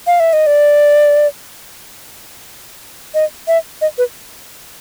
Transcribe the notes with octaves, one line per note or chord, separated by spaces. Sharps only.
F5
E5
D#5
D5
D#5
E5
D#5
B4